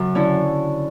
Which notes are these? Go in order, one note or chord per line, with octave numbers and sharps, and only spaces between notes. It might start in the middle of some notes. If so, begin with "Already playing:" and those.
Already playing: F#2 C#3
D3 C#4 E4